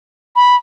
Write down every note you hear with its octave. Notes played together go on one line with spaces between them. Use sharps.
B5